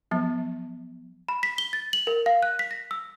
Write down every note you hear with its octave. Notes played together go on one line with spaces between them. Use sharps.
F3 F#3 B3
B5
B6
G7
A6
F#7
A#4
F5
F#6
B6
A#6
E6